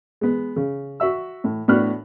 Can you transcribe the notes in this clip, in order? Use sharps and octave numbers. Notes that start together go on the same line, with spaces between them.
G#3 B3
C#3
F#4 E5 E6
A2
A2 B3 D4 F#4 F6 F#6